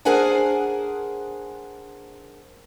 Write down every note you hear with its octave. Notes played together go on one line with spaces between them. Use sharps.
D4 G#4 A#4 C5 F#5 G#5